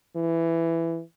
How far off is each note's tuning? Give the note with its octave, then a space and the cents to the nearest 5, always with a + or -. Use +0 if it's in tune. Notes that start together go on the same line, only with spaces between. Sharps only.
E3 +10